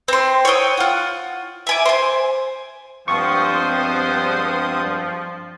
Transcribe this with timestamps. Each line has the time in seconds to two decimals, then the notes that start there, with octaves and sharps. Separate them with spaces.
0.08 C4 C6
0.45 C#5 F#5 G5 D#6
0.77 F4 F#5
1.67 E5 G#5 D6
1.86 C5 G#5
3.08 G2 F3 G#3 B3 C4 C5 C#6 D#6